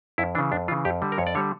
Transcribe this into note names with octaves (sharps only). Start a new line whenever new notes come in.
F2 E4
C#3 E3 D4
F2 D4
C#3 E3 F4
F2 G4
D3 G3
A#4
F2 C#5
D5
D3 G3 C#5